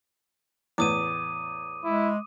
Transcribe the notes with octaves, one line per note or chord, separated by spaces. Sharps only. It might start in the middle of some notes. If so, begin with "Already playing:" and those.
E2 A2 D6 D#6 D#7
G#3 E4